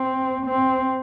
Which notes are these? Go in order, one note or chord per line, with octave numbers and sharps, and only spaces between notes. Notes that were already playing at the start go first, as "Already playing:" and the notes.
Already playing: C4
C4